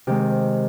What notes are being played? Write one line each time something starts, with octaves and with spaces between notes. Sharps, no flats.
C3 D#3 G#3 G4